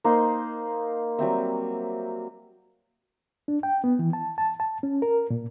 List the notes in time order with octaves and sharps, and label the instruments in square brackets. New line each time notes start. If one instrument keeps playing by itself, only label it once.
[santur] A#3 D#4 C5 C6
F#3 G3 C4 E5
[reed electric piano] D4
G5
B3
E3
A5
A5
A5
C#4
A#4
A#2